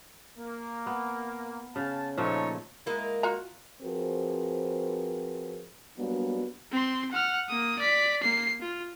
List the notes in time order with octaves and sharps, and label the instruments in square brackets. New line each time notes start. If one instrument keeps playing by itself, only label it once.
[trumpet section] A#3
[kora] B3
[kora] C#3 [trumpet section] F5 A5
[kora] A#2 F3 A3 [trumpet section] D#4 A4 C#5
[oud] G#3 A#3 E4
[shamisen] F4 F#4 A#5
[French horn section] F3 C4 F#4 G#4 A#4 B4
F#3 G3 A#3 B3 D4 F#4
[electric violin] C4 C6
F#5 F6
A#3 D#6
D5 B6
A#3 C7
F4